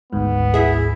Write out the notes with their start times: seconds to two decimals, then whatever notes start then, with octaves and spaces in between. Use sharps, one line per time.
0.13 G#1 D2 G#2 B3
0.54 E4 G#4 E5